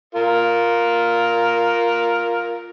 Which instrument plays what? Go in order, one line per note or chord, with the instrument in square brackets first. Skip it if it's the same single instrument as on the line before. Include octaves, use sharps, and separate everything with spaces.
[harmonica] F4 A#4